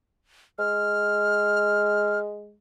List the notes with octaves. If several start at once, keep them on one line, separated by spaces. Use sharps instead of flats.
G#3 F6